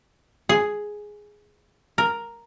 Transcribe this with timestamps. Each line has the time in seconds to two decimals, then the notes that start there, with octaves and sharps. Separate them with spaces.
0.49 G#4
1.98 A#4